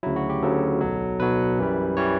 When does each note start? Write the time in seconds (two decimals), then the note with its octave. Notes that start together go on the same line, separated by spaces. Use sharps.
0.03 D2 C#3 F#3 E4
0.16 F#4
0.30 G4
0.42 D2 C#3 F#3 A4
0.81 B1 B2 F#3
1.19 B1 B2 F#3 B4
1.59 F#2 E3 G3
1.97 E3 G3 C#5